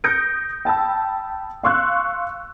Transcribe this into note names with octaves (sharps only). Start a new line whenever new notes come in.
D#6 G6 A#6 C#7 D7
G5 A5 B5 E6
F5 C6 C#6 E6 F#6